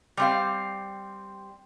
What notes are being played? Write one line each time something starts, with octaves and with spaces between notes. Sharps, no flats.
G3 C4 F5